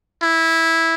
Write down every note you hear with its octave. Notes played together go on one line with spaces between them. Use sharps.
E4